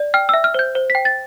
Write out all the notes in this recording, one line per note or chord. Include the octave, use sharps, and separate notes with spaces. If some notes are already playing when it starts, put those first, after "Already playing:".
Already playing: D5
G5 F6
E5 E6
F6
C5 G6
C5
B6
G5
A6